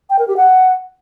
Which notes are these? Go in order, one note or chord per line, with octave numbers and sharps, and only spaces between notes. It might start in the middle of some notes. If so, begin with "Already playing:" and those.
G5
A#4
G4
F#5